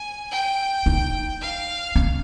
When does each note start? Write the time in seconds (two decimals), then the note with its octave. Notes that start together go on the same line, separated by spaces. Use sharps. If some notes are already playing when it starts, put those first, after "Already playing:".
Already playing: G#5
0.31 G5
0.86 D#4
1.40 F5
1.95 C#4